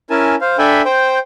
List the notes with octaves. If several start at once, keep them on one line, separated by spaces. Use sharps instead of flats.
C#4 E4 A#4 G#5 A5
C5 F5
D4 A4 E5 G5 G#5 B5
C5 G5